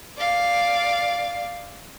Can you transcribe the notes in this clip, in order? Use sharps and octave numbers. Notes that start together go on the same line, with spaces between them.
D5 F5